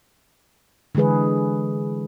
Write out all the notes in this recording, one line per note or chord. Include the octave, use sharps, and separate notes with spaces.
D3 E3 G#3 G#4 B4